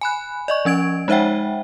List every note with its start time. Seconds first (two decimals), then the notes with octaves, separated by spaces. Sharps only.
0.01 G#5 B5 F#6
0.48 D5 D#5 C#6
0.65 F3 C#4 G#6 D7
1.08 G#3 D#4 C5 E5 F#5 G5